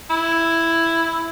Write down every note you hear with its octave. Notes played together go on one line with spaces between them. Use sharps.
E4